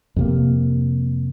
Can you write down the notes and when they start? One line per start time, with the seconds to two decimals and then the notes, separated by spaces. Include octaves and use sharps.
0.16 F2 C3 A#3